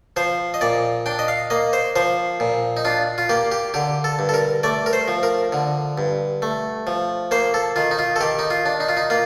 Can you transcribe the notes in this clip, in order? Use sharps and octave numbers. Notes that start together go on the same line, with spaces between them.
F3 C5
D#5
A#2 D5
D4 G5
D#5
F5
A#3 D#5
C5
F3 C5
A#2
D#4
D4 F4
F4
A#3 G4
G4
D3 G4
A4
G2
A4
A#4
A3 D5
A#4
C5
F3
A#4
D3
G2
A3
F3
A#3 C5
A4
D#3 F4
D#4
F4
A4
D#3 G4
D#4
F4
D4
D#4
F4
D#4
A#3 F4